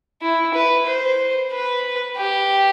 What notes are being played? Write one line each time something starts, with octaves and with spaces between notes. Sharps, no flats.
E4
B4
C5
B4
G4